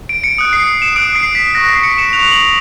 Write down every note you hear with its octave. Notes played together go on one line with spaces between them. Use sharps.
D7
C#7
D#6 F#6
C7
C#7
E7
D#6 F#6 D7
C7
B6
C#6 F#6 A#6
C7
C#7
E7
C#6 F#6 F7
F#7